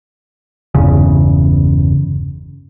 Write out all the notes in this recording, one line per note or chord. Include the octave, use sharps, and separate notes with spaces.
G1 E2 C#3